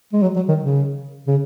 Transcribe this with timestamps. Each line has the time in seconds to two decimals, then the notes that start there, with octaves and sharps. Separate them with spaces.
0.13 G#3
0.22 F#3
0.36 F#3
0.48 D#3
0.62 C#3
1.27 C#3